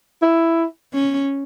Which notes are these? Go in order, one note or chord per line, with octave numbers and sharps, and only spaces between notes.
E4
C#4